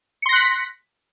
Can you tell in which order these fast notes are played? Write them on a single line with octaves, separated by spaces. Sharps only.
C#7 C6 A#6 F#6 B6